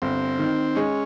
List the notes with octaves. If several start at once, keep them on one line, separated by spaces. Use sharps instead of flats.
G1 C4
D#3
G#3 C#4